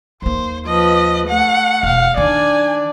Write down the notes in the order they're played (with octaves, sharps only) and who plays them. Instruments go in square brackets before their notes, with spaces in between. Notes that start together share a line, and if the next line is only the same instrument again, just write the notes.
[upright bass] D#2 A#3 [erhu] C5
[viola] F3 B4 [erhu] D#5
[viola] A3 [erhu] F#5
[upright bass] E1 [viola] F5
[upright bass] D#3 [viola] D4 D5 [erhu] G#5